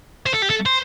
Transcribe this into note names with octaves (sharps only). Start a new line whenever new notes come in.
C5
A4
G4
A4
C5